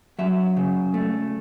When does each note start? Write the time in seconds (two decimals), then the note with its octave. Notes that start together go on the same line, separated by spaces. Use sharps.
0.19 F#3 E5
0.57 C#3
0.94 A3